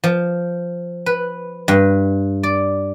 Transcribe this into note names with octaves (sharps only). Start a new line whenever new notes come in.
F3
B4
G2
D5